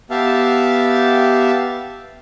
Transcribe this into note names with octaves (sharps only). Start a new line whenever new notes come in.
B3 G4 E5 F5 A5